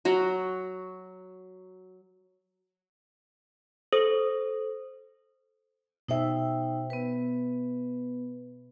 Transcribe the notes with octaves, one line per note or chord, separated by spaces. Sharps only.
F#3 F#4
A4 C5 D#6
B2 D#4 C5 E5 G5
B3 B4